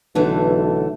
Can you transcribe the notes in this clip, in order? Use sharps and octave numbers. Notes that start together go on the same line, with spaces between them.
B1 D3 E3 A3